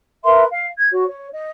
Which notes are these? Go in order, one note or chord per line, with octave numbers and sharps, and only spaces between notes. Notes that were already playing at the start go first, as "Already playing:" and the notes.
A#4 B4 E5 C6
F5
G#6
F#4 C#5
C#5
D#5